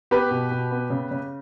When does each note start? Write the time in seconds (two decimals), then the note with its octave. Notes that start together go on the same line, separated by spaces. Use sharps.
0.11 B3 G4 B4
0.31 B2
0.51 B2
0.71 B3
0.90 C#3
1.11 C#3